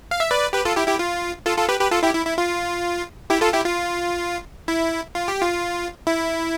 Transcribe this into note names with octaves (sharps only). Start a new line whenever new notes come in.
F5
E5
B4 D5
G4 B4
F4 A4
E4 G4
E4 G4
F4
F4 A4
F4 A4
G4 B4
G4 B4
F4 A4
E4 G4
E4
E4
F4
E4 G4
F4 A4
E4 G4
F4
E4
F4
G4
F4
E4